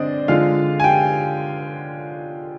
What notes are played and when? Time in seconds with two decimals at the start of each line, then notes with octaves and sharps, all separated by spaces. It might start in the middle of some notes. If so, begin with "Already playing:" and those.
Already playing: D3 G#3 C4 D4 C5 D5 D#5
0.28 D3 G#3 F4 F5
0.80 G#5
0.84 G4 G5